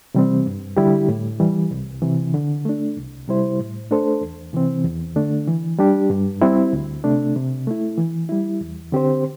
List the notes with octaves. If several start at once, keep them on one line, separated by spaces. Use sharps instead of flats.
C3 E3 G3 C4
G2
D3 G3 E4 G4
A2
E3 G3
C2
C3 E3
D3
A3 D4
C2
C3 G3 E4 C5
A2
A3 D4 A4 C5
E2
C3 E3 C4
E2
D3 A3 D4
E3
G3 D4 G4
G2
G3 C4 E4
D2
C3 A3 D4
C3
A3 E4
E3
G3 E4
E2
D3 C4 G4 C5